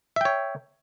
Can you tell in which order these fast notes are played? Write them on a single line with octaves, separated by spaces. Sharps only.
E5 G5 C#5